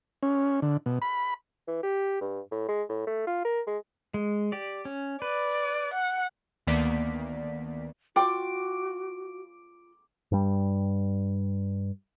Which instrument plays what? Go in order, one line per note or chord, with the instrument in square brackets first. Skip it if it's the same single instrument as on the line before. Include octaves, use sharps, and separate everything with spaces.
[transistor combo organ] C#4
D3
B2
B5
[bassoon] E3
G4
G2
A2
G#3
A2
A3
F4
A#4
G#3
[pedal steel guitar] G#3
G4 D5
C#4
[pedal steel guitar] B4 [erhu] D5
[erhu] F#5
[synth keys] D2 D#3 A#3 B3 D5 B6
[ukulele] F4 G5 [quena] F#4 [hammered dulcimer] D6
[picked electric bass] G2 G3